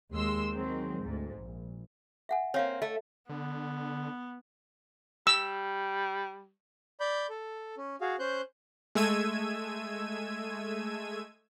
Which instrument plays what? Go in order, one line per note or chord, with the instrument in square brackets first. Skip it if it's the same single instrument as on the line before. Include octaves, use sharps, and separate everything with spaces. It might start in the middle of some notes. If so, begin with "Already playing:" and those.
[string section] D#2 G#3 C6 E6
D#3 F#3 G#3 C4
D2 G#2
A#1
[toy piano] E5 F#5 G#5
[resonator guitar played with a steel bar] A#3 C4 [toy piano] C#5 F5
[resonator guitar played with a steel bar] A3 [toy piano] D#5
[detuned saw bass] D3 [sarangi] B3
[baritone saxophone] G3 [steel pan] E6
[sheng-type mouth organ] D5 B5 G6
A4
C#4
F#4 G#4 F5
C#4 C5 F#6 G6
[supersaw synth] G#3 A3 E6 G#6 D#7